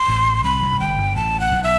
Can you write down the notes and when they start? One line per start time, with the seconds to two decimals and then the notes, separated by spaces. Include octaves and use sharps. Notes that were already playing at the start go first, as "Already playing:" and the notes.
Already playing: C6
0.08 A1 A2
0.44 C2 C3 B5
0.63 C2 C3
0.72 F#2
0.80 G1 G2 G5
0.98 G1 G2
1.15 A1 A2 A5
1.40 F#5
1.51 B1 B2
1.64 E5